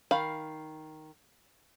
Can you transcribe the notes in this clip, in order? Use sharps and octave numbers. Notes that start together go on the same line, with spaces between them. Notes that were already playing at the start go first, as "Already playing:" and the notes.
D#3 F5 B5